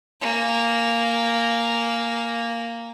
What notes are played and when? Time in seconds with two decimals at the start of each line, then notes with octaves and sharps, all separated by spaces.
0.21 A#3 G#5